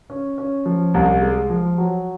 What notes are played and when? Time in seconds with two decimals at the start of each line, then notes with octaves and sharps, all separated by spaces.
0.10 C#4
0.38 C#4
0.66 F3
0.94 C2
1.22 G#3
1.50 F3
1.78 F#3